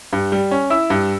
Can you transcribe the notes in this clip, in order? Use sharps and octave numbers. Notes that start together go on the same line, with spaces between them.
G2
G3
C#4
E4 E6
G2